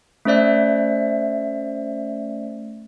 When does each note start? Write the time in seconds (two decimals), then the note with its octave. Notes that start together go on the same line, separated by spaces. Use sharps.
0.25 A3 C#4 C5 D5 E5